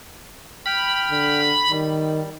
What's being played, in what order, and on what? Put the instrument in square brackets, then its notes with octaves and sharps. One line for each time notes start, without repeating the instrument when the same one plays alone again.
[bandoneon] G5 F6 [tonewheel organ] B5
[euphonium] D3
[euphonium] D#3 [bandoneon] G3